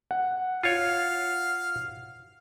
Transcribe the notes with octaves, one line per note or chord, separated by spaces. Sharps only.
F#5
F4 C#5 F5